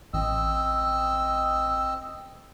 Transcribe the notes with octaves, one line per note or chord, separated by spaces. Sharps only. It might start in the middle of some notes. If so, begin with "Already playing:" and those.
A1 C4 D#5 E6